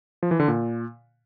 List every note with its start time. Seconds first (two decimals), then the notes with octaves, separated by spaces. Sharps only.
0.23 F3
0.31 E3
0.40 D3
0.48 A#2